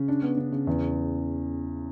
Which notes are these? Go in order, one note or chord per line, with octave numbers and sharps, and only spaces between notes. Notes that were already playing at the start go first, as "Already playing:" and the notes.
Already playing: C#3
D4
B3
C#3
C#3
E2